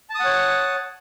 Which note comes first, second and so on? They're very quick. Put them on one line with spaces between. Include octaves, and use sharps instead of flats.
A5 D#6 F#5 C#5